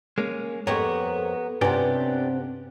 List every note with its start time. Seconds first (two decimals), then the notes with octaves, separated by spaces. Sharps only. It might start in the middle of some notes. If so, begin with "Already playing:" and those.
0.18 G#3 A#3 C#4
0.67 F2 B3 G4 A#4 C#5
1.61 G2 C3 B3 C#4 D4 G4 B4 G#5